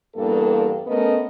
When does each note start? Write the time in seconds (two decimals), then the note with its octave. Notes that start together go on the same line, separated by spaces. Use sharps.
0.15 E2 G2 A#3 A4
0.86 A3 B3 C#4 A#4 D#5